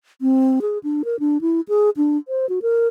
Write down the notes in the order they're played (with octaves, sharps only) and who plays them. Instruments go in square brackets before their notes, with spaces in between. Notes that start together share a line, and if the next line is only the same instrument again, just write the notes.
[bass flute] C4
G#4
D4
A#4
D4
E4
G#4
D4
C5
F#4
A#4